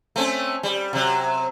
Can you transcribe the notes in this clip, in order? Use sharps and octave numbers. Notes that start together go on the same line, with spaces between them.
A3 C4 C#4
G3
C3 F#3